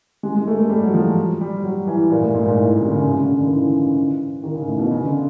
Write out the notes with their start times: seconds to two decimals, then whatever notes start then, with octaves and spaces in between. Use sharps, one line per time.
0.23 G#3
0.35 G#3
0.47 A3
0.59 A3
0.70 G3
0.82 F#3
0.94 F3
1.41 G3
1.64 F#3
1.87 E3
2.10 A#2
2.22 A2
2.34 G#2
2.45 A#2
2.57 A2
2.69 A#2
2.80 C3
2.88 D3
2.92 C#3
3.04 C#3
3.16 C#3
3.27 D3
3.39 D#3
3.51 E3
4.44 D#3
4.56 C#3
4.67 A2
4.79 B2
4.91 C#3
5.06 D3